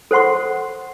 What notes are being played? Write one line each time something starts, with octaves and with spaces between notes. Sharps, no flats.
A4 C5 F#5 C6 C#6